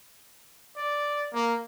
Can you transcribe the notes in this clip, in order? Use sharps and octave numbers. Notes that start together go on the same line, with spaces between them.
D5
A#3